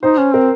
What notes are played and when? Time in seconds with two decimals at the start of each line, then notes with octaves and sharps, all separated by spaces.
0.03 D#4 C5
0.18 C#4
0.34 C4 A#4